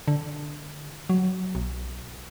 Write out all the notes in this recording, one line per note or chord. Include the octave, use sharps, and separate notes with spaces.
D3
F#3
B1